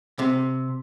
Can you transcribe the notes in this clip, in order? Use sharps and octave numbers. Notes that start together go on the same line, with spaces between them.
C3